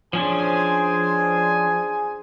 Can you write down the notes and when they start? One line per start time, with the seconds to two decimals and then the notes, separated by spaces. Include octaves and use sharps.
0.13 F3 C#4 D4 G#4 C5 G#5